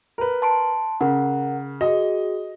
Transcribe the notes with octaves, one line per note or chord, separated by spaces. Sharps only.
A#4 B4
A5 C6 D7
C#3 A#4 F#5
F#4 G#4 D#5